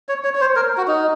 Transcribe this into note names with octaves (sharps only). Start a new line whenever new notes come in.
C#5
C#5
C#5
C5
A#4
F#4
D#4